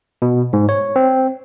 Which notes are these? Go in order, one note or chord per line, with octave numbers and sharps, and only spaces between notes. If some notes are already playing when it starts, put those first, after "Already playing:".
B2
G#2
C#5
C4